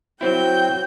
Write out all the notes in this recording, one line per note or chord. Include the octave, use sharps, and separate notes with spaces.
F#3 C4 E4 F#4 G5 G6